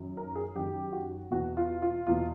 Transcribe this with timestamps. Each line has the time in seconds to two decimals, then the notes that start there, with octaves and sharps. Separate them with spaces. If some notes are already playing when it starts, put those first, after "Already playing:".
Already playing: F#2 D#3
0.17 A#4
0.35 G#4
0.56 F#2 D#3 G4
0.92 F#4
1.31 E2 B2 F#4
1.57 F4
1.82 F4
2.07 E2 B2 F4